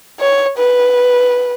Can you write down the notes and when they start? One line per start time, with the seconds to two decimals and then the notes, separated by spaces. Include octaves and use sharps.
0.20 C#5
0.58 B4